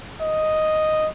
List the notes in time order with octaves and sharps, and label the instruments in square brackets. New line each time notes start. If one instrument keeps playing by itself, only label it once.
[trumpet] D#5